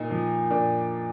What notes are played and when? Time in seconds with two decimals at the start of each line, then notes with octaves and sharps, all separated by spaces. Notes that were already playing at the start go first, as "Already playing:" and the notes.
Already playing: A#2 D#4
0.10 F3
0.51 A#2 D4